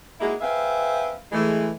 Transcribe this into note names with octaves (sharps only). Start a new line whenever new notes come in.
G#3 A#3 D#4 E4 F#4 G#4
C4 G#4 B4 E5 F5
E3 G#3 A3